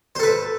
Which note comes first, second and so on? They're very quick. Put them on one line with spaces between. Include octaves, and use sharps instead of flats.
C5 A4 B4